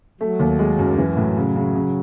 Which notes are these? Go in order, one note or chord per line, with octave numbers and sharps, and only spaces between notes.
F#3 A3
D#2
G#3
F#2
E3 F#3
A2
C#3
C#3
C#3